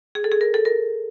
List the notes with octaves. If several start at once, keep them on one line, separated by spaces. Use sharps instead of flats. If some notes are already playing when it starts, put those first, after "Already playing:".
G#4
A4
G#4
A#4
A4
A#4